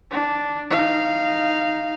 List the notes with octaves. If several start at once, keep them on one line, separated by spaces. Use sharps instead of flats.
D4
D#4 F5